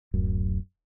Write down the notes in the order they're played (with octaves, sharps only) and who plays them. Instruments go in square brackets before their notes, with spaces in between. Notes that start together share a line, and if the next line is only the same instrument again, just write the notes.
[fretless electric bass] D1 F#2